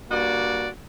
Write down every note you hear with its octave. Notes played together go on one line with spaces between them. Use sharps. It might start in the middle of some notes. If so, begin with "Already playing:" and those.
G2 A#3 F#4 D5